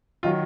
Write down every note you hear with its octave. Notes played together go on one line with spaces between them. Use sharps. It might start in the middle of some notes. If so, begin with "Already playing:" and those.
D#3 F#3 F4